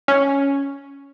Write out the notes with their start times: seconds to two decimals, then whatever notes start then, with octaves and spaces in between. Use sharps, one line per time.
0.08 C#4